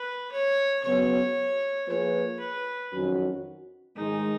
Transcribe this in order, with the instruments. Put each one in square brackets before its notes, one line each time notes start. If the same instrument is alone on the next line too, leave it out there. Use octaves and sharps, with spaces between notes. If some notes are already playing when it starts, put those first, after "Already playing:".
Already playing: [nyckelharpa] B4
C#5
[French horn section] C#3 F#3 B3 F#4 [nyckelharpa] C#5
[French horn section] F3 A#3 F4 G#4 B4 [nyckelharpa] C#5
[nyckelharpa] B4
[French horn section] F2 D#3 F#3 C#4 F#4
[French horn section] G#2 D#3 G#3 [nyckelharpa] D#4